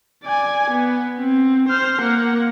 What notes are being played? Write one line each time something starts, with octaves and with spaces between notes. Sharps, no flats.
D5 G#5
B3
C4
C5 F6
A#3 F#5